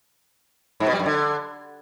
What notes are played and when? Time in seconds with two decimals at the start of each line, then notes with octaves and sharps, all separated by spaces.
0.80 G#2
0.87 B2
0.93 G3
0.99 F#2
1.06 D3